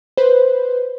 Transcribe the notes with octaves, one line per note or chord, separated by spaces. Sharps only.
B4 C5